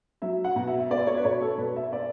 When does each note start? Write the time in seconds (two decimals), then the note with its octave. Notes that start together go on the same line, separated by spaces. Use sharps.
0.22 F#3 E5
0.44 F#5
0.56 B2
0.67 E5
0.80 E5
0.91 B3 D5
1.07 C#5
1.17 B4
1.25 B2 C#5
1.42 A4
1.58 B2 B4
1.76 E5
1.93 D5